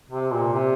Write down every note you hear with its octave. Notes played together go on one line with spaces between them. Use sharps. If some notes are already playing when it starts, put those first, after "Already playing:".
C3
A#2
C3